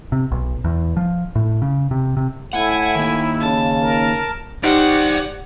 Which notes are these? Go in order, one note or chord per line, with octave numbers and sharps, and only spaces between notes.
C3
B1
E2
F3
A2
C#3
C3
C3
A2 E4 F#5 G#5
D#3 A#3
C#3 A5
A#4
D#4 G4 C5 D5 F#5